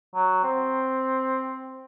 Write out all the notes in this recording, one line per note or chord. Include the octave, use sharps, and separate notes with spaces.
F#3
C4